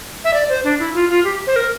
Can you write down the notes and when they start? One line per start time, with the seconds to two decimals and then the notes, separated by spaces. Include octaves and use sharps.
0.24 E5
0.34 D5
0.49 C5
0.64 D4
0.79 E4
0.94 F4
1.09 F4
1.25 G4
1.47 C5
1.56 A#4